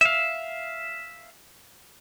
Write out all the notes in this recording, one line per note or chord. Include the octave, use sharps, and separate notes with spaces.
E5 F5